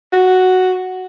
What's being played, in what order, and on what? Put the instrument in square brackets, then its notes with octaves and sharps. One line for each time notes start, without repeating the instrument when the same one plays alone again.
[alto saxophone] F#4